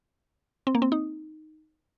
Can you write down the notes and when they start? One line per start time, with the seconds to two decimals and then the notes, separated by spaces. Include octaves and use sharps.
0.67 C4
0.75 A#3
0.82 C4
0.92 D#4